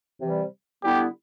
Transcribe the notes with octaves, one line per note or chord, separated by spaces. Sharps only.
C3 E3 G3
D3 G3 B3 E4 G4